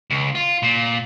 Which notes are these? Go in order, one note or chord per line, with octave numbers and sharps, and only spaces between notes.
C#2
F4
A#2